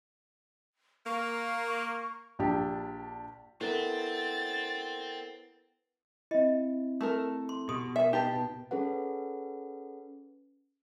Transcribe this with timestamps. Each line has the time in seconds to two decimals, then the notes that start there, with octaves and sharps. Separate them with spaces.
1.06 A#3 C#6
2.39 A#1 D4 G4
3.61 B3 C4 E4 A4 A#4 A6
6.31 C4 E4 D#5
7.01 A3 A4 A#4
7.49 C6
7.69 B2 G4 C6 D#6
7.96 A#4 E5 G5
8.13 D#4 G4 B4 A5
8.71 C#4 G#4 A4 B4 F#5